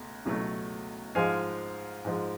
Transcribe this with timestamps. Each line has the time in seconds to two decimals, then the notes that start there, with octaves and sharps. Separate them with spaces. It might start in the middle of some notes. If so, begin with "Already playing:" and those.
Already playing: C#2 B2 A3
0.25 C#2 B2 F#3 A3
1.15 G#2 F3 G#3 F5 G#5
2.05 G#2 F3 G#3